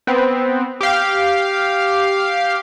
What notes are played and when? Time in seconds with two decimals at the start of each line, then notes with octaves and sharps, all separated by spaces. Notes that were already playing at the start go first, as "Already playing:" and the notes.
0.07 B3 C4
0.81 G4 F5